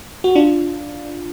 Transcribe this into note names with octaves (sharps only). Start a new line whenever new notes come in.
F#4
D4 F4